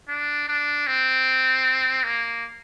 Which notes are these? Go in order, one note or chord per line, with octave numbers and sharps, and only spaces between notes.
D4
D4
C4
A#3